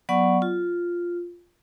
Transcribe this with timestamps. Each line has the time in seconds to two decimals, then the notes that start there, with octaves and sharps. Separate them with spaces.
0.09 F#3 B3 D5 F#5 C#6
0.42 F4